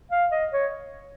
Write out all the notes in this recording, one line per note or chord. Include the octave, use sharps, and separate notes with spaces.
F5
D#5
C#5